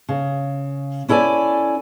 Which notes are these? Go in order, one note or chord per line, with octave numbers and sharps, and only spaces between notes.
C#3
C#4 E4 A4 D5 G#5